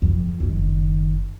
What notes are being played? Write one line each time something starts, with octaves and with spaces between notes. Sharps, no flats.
F2
F#1 D#3